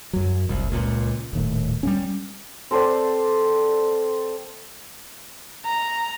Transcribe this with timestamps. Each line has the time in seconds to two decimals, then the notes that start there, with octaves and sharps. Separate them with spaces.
0.13 F#2 F#3
0.49 F1 C2
0.72 C#2 A#2
1.33 D#1 D#2 A2
1.83 G3 B3 C#4
2.71 C4 A4 C5 D5
5.65 A#5